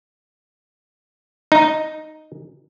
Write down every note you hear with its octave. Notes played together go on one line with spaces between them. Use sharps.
D#4